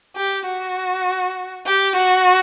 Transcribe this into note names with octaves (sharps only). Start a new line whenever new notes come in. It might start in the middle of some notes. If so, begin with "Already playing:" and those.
G4
F#4
G4
F#4